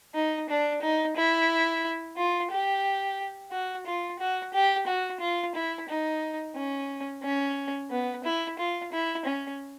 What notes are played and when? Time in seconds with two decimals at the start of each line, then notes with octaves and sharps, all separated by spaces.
0.15 D#4
0.49 D4
0.82 D#4
1.16 E4
2.17 F4
2.51 G4
3.51 F#4
3.86 F4
4.19 F#4
4.53 G4
4.86 F#4
5.20 F4
5.55 E4
5.88 D#4
6.56 C#4
7.23 C#4
7.90 B3
8.24 E4
8.58 F4
8.92 E4
9.25 C#4